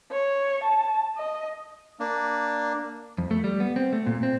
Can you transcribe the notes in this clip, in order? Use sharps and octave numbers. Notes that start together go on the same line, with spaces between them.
C#5
A5
D#5
A#3 D4
F2
A3
G3
B3
C4
A3
A#2
C4